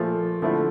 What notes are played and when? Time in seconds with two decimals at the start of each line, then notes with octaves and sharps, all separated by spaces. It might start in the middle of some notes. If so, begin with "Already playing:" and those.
Already playing: A#2 F3 A3
0.42 D3 F3 A3 E4